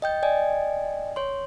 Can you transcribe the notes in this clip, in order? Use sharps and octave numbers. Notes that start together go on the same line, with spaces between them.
D#5 G5 G6
D5 D#5 G5 G#5
C#5 C6